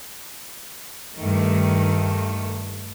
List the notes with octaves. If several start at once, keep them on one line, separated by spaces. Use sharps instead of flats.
G2 D#3 A3